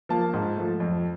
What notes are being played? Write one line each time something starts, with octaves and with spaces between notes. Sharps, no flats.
F3 A#3 A5
G#2
F3 A3
F2